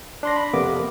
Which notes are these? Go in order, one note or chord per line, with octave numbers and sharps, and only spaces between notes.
D4 C6 A#6
B5
F2 C3 A#3 B3 D6